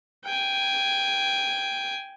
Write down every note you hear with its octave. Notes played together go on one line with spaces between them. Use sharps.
G5 G#5